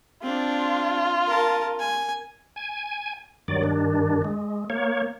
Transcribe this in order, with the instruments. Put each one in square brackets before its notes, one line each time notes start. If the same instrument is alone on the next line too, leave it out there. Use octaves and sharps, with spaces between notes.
[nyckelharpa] C4 D4 [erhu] F4
[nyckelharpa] A#4 A5
G#5
[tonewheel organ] G#5
G2 D#3 F#3 D5
G2 D#3 D4
G#3
A#3 C#5